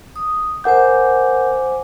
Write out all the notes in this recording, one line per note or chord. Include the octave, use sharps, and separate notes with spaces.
D#6
A#4 C5 F#5 G#5 D6 G6